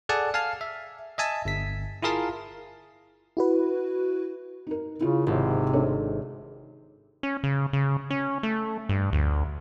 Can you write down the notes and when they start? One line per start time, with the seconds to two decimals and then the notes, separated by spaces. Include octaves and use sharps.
0.09 G#4 A4 D5 F#5 G#5 A5
0.34 F5 G#5 A5 F6 C7
0.61 E5
1.18 D#5 E5 G#5 A5 E6
1.45 G1 B6
2.02 E4 F4 G#4 A#4 F5 A5
3.37 E4 F#4 B4
4.67 D#4 A#4
5.01 C#3 E4 F4
5.27 G#1 C3
5.73 D4 A4 C#5
7.23 C#4
7.44 C#3
7.73 C#3
8.10 C#4
8.43 A3
8.89 G2
9.13 D2